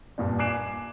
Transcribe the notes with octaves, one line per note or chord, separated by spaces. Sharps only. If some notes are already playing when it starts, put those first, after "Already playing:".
G2 A#2 D4
G#5 D6 F#6 C7 D7 E7